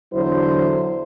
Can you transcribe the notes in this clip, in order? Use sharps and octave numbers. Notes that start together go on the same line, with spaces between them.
E2 D3 F#3 E4 C5